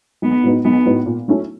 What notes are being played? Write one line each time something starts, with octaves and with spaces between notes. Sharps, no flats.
B1 B3
A2 F#3 B3 D#4
B1 B3
A2 F#3 B3 D#4
A#2
F#3 A3 C#4 E4